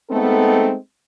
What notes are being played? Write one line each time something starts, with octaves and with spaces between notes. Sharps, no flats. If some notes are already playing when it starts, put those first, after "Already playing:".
G#3 A3 B3 C4 D#4 A4